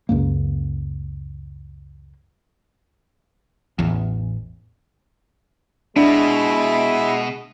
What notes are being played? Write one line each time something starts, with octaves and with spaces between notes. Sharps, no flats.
C#2 F#2 A#3
A1 E2
B2 G#3 D4 E4 E5